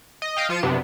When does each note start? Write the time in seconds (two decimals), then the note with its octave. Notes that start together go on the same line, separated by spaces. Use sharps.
0.22 D#5
0.37 D#5 F5 G5
0.49 F3 F4 C#7 D#7 E7
0.63 F#2 C3 B3 D4